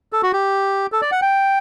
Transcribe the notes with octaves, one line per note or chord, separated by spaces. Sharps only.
A4
F#4
G4
A4
D5
F#5
G5